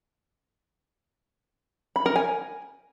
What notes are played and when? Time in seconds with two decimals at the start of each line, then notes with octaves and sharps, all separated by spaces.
1.96 B5
2.06 A#4
2.16 G#5